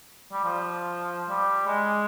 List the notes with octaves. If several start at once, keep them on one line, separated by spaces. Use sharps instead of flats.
G3
F3
G3
G#3